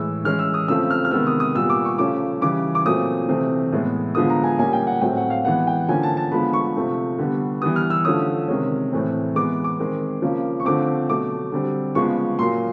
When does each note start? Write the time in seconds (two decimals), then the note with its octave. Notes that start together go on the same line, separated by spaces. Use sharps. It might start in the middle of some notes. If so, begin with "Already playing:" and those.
Already playing: A2 E3 G#3 E6
0.24 E3 G#3 C#4 F6
0.39 E6
0.54 D#6
0.68 C#3 F3 A3 C4 E6
0.90 F6
1.05 F6
1.11 C3 D#3 G#3 B3 E6
1.27 D#6
1.40 D#6
1.55 A#2 G3 B3 E6
1.70 D6
1.85 C#6
1.98 C#3 F3 A3 C#4 D6
2.41 C#3 E3 G3 D6
2.75 D6
2.85 A#2 F#3 A3 C4 D#6
3.28 C3 E3 A3 C4
3.72 A2 E3 G#3 B3
4.15 D3 F3 G#3 B3 D#6
4.30 A#5
4.44 G#5
4.58 A#2 G3 A#3 C#4 G#5
4.73 G5
4.87 F#5
5.01 A2 F#3 A3 C4 G5
5.17 F#5
5.30 F5
5.45 E3 G#3 B3 F#5
5.67 G5
5.89 D3 F3 A#3 C#4 G#5
6.03 A5
6.17 A5
6.31 D3 F3 G#3 B3 B5
6.53 C#6
6.76 C3 F3 A3 C4
7.18 D3 G3 B3
7.62 E3 G3 B3 D#6
7.76 F6
7.90 E6
8.05 D3 F3 A3 C#4 D#6
8.48 C3 D#3 G#3 C#4
8.93 A2 E3 A3 C4
9.35 E3 G#3 B3 D6
9.64 D6
9.79 D#3 G#3 C4
10.22 C#3 F3 A#3 C#4
10.60 C#6
10.65 D3 F3 A3 C4 D6
11.08 B2 F#3 A3 D6
11.52 D3 G3 C4
11.95 C#3 F3 G#3 B3 C#6
12.39 A#2 F#3 A#3 C6